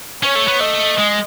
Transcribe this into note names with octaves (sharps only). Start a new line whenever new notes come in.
C#4 C#5
A3
B3
A3 D#5
G#3